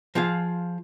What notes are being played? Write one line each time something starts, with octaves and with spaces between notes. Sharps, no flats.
F3 F4 G#4 F5